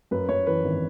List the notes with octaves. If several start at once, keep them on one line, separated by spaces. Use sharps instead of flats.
F#2 B4
F#2 C#5
E3 B4
G#1